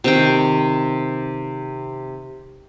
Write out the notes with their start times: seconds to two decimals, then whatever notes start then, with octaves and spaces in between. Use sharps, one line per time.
0.04 C3 D#3 G5